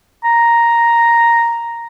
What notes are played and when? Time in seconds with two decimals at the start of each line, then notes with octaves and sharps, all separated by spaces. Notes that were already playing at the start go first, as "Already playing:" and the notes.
0.24 A#5